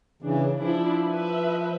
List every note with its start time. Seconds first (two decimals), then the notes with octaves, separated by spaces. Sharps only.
0.22 C#3 E3 D4
0.59 F3 D4 E4
1.07 B4 E5